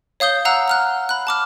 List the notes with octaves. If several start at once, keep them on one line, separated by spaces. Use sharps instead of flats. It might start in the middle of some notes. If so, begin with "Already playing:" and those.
C#5 F5 D#6 G6 G7
F5 F#5 A#5 E6 F#6
A#5 F6 F#6
B5 F#6
A5 D6 F6